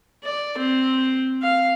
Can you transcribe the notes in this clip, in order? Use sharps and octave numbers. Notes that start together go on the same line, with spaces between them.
D5
C4
F5